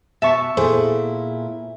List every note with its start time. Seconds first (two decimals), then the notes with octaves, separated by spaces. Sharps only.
0.22 B2 E5 A5 C#6
0.57 A#2 E4 G#4 A4 C5